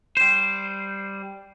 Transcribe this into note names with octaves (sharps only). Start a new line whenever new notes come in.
G3 C5